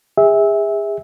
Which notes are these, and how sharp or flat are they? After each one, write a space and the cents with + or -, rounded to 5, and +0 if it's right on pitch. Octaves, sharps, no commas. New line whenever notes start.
G#4 -30 E5 -20